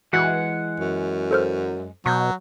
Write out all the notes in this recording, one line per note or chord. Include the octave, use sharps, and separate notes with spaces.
E3 G#3 F#4 F#5
F#2
A4 C5 F6
B2 F#3 C#6 G6